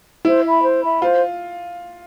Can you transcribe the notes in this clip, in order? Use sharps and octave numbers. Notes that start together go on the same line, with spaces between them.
E4 C5
E5 B5
C5
E5 B5
F4 C5